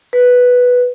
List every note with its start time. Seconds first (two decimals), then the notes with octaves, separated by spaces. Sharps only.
0.13 B4